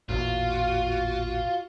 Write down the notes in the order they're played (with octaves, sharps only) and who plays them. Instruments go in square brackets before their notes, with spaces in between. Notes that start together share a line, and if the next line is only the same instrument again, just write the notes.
[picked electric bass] A1 E2 A#2 [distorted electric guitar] F4 [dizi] F#4